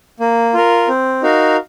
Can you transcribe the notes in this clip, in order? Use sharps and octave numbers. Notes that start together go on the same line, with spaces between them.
A#3
F4 A#4
C4
D#4 F#4 A#4 F5